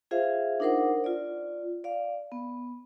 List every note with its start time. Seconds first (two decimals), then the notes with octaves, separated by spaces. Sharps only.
0.11 F4 G#4 C5 E5 F5
0.60 D4 D#4 A#4 C5 F#5
1.04 F4 D5
1.84 D5 F5
2.32 B3